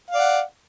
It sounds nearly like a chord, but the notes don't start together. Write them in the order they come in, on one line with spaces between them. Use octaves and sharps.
F5 D5 F#5